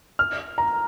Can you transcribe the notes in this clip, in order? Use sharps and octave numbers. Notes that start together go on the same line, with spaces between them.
F6
A#5